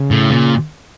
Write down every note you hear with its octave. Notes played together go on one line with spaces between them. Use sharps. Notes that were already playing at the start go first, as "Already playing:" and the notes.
Already playing: C#3
A2
A#2